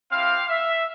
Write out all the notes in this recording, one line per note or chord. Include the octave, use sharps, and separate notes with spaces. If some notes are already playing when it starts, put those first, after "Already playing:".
C4 E4 G4 F5
E5